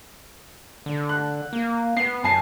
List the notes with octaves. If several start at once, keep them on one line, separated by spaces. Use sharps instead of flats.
D3
F#6
A#3
B3 C7
F#2 G#5 A5 C7